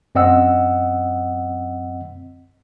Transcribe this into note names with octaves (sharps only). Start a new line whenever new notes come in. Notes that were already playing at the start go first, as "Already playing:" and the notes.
F#2 C4 D#5 F#5 E6